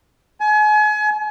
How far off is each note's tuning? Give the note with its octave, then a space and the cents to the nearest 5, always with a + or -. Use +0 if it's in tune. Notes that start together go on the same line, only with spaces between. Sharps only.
G#5 +35